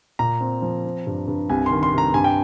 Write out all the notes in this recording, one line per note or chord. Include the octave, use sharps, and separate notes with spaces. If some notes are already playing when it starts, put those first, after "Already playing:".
A#2 A#5
C4
F3
C4
G2
G2
C2 G#5
D#3 C6
C6
C3 A#5
G2 G#5
G5